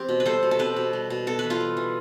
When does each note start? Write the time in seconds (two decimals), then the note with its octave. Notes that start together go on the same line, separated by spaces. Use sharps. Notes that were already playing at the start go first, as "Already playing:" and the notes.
Already playing: E3 B3 C4 G4
0.09 B2
0.20 B4
0.25 G3 A4 C5
0.43 B2
0.51 A4
0.59 C4 G4 B4
0.76 B2
0.93 G3
1.10 B2
1.27 B3 A4
1.39 E3 B4
1.50 F4 A4
1.61 G3
1.77 E3